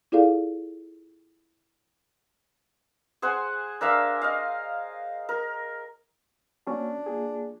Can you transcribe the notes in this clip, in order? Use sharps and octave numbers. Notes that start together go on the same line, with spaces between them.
E4 F4 G#4 A4 D5 F5
G#4 C5 F#5 G#5
D4 A#4 E5 F5
D#5 F5
A#4
A#3 C#4 D4 F#4
A#3 F4 G#4